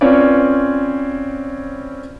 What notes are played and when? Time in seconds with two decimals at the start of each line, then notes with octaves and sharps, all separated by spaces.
0.01 C4 C#4 F4 B4 C#5 D5